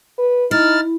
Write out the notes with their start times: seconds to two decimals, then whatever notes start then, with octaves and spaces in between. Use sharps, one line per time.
0.18 B4
0.51 D#4 E4 F6 A6